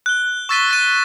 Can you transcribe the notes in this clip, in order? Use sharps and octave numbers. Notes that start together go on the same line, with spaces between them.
F#6 G7
C#6 E6 A6 B6 D#7 G7
A6 D#7